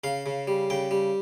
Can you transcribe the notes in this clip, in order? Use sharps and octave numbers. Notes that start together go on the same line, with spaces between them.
C#3 F5
C#3
G3
C#3 G5
G3